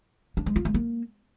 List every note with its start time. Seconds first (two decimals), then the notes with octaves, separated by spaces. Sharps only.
0.37 D4
0.46 G#3
0.56 F4
0.65 G#3
0.74 A#3